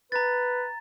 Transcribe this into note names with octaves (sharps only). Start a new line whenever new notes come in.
B4 A#5 A6